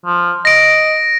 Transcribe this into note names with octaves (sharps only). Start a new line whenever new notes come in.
F3
D#5 A#6 D7